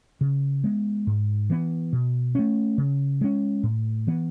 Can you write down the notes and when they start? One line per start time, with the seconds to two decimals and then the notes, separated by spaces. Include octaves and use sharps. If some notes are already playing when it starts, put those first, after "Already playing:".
0.21 C#3
0.64 G#3 B3
1.07 G#2
1.50 E3 B3
1.93 B2
2.35 A3 C#4
2.78 C#3
3.21 G#3 C#4
3.63 A2
4.07 E3 B3